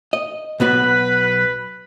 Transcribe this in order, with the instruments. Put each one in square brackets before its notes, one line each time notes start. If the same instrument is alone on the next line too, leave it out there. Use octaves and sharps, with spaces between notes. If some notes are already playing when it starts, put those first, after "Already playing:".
[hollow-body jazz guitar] D#5
[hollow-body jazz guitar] B1 B3 F#4 [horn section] B4